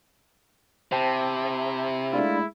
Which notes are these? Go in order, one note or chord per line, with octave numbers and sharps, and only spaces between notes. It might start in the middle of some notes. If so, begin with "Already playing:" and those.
C3 E4 C5 G5 A5
G#3 A3 D4 E4 F4 D5 B5